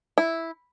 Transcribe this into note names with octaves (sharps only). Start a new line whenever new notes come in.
E4